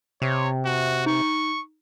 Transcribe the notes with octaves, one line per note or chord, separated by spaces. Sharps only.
C3 C#5
F#4
D#4 C#6